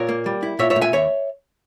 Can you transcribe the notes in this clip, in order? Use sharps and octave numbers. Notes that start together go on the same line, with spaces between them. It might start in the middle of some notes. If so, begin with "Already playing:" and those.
Already playing: A#2 A#4 C#5
A#3
G3
E4
A#2 C#5 E5
C#5 E5
A#2
E5 G#5
D#2 C#5 E5